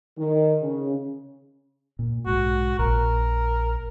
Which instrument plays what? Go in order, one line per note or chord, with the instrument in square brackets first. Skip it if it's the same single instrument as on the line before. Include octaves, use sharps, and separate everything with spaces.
[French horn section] D#3
C#3
[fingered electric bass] A#2
[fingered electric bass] B1 G#2 [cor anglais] F#4
[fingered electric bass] A#1 [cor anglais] A#4